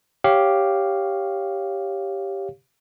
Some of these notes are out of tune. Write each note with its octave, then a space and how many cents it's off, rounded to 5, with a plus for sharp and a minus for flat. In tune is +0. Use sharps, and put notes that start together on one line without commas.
G4 +0 C#5 +0 F5 +0